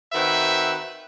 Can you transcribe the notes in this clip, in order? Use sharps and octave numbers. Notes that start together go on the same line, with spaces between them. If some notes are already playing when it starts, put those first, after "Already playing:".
D#3 C4 F#4 B4 E5